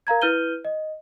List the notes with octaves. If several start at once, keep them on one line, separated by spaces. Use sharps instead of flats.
A#4 F5 A#5 G#6
E4 B4 F6 G6 D#7 G7
D#5